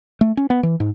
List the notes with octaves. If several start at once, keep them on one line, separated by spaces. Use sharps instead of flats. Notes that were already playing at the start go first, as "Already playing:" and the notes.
A3
C#4
B3
E3
G#2